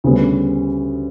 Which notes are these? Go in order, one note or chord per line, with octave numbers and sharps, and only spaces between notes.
D2 C#3 G3 B3